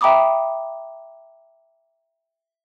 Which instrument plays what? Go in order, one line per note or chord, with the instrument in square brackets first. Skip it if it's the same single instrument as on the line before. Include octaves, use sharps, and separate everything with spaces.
[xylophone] E5 G5 A#5 B5 D6 D#6